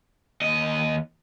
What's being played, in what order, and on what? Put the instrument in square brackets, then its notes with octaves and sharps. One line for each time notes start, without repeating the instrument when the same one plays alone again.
[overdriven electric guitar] D#2 D#5